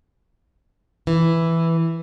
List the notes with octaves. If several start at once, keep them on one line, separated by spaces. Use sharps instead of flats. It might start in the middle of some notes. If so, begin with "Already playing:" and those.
E3